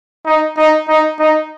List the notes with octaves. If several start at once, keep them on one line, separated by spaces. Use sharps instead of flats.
D#4
D#4
D#4
D#4